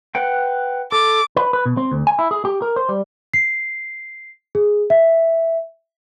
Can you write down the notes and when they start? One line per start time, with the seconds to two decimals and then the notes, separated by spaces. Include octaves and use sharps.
0.15 B4 F#5 G5
0.92 A4 D6
1.36 B4
1.53 B4
1.66 B2
1.77 C4
1.92 D2
2.07 G#5
2.19 E4
2.31 G#4
2.45 G4
2.62 A#4
2.76 C5
2.89 G3
3.34 C7
4.55 G#4
4.90 E5